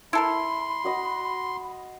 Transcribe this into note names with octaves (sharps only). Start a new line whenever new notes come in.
E4 A4 A#4 B5 C6
F#4 D#5 F#5